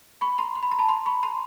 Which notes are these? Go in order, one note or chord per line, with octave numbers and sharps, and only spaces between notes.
B5 C#6
A#5 C6
C6
B5
A#5
A5 B5
A#5 C6
B5 C#6
A#5 C6